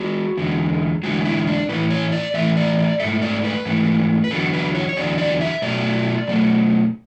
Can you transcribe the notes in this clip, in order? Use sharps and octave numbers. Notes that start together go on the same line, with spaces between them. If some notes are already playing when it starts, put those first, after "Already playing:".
Already playing: G#3 F#4
E2 D3 G#3
E2 D3 G#3 F#4
E4
D4
A2 E3 A3 B4
C#5
D5
A2 E3 A3 E5
D5
D5
G#2 E3 A3 E5
D5
B4
G#2 E3 A3
B4
E2 D3 F#3 A4
B4
C#5
C#5
E2 D3 F#3 D5
D5
E5
B2 F#3 A3 D5
B2 F#3 A3